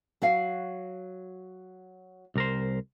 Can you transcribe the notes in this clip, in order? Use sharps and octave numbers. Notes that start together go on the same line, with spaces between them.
F#3 F#4 F5
C2 A#4 C5